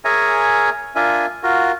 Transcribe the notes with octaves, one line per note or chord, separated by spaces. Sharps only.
G#4 A#4 C#5 E5 G#5 A#5
D4 F4 A#4 E5 G#5
F4 F#4 A#4